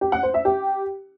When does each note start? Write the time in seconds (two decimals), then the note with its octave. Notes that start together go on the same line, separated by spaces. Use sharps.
0.01 G4
0.12 F#5
0.23 C5
0.34 E5
0.45 G4